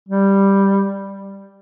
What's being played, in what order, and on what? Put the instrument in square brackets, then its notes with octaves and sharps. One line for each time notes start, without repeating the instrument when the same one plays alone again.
[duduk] G3